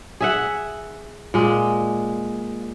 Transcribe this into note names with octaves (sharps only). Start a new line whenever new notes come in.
G#4 E5 F#5
A#2 G#3